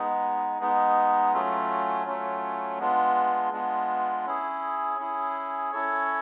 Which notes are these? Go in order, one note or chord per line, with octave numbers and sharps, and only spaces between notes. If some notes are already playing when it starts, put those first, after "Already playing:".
Already playing: G#3 B3 D#4
G#3 B3 D#4
F#3 A3 C#4 F4
F#3 A3 C#4 F4
G#3 B3 D4 F4
G#3 B3 D4 F4
C#4 E4 G#4
C#4 E4 G#4
C#4 E4 A4 C#5